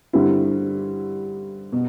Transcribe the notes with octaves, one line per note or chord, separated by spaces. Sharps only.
G2 D3 G3 C4 E4
B2